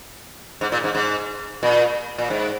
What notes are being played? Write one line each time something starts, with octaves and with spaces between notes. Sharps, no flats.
G#2
A#2
G#2
G#2
A#2
A#2
G#2